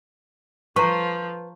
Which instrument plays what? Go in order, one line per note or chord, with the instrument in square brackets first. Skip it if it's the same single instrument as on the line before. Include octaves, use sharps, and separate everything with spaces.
[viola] F3 [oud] B4 [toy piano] A#5 C#6